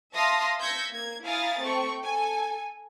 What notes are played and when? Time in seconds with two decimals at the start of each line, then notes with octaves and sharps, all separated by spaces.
0.15 E5 F5 A5 C6 D#6 A#6
0.59 E6 G6 G#6 A#6 B6 C#7
0.92 A#3 G#6
1.24 E4 F5 G#5 A#5 D#6 A6
1.62 A3 C4 C5 G5 C#6
2.03 A4 G#5